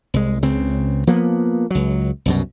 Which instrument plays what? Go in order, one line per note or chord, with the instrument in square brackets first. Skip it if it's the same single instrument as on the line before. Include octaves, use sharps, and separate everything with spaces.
[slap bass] C2 G#3
C#2 C#3 C4
F3 A#3 B3
C#2 F#3
C2 F#2 B2